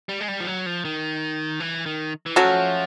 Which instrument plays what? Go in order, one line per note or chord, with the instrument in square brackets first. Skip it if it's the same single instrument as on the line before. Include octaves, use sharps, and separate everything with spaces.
[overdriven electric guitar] G3
G#3
G3
F3
F#3
F3
D#3
E3
D#3
E3
[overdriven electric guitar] F3 [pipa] F#3 A3 C#4 F#4